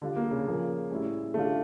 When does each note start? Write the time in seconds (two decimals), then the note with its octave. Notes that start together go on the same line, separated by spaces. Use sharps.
0.02 D3 G3 D4 F4
0.16 A#3
0.31 C#3
0.46 A#2 F3 A#3
0.91 A2 G3 C#4 E4
1.34 D3 G3 A3 D4 F4